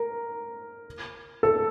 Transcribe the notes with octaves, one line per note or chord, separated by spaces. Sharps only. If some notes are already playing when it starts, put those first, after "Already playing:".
Already playing: A#4
A4